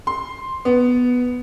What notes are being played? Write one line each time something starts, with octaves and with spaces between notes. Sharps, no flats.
C6
B3